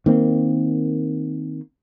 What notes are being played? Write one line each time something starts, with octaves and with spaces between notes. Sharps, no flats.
D#3 A#3 C4